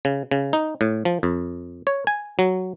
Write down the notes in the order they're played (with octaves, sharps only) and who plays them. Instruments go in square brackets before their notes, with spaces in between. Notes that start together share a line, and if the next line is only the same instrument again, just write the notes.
[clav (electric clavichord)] C#3
C#3
D#4
A2
F3
F2
C#5
G#5
F#3